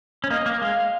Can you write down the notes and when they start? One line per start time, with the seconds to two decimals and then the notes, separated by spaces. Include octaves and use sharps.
0.24 C#4
0.30 A#3 D#5
0.46 A#3
0.61 G#3 F5